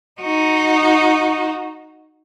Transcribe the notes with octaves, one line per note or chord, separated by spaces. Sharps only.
D#4 F#4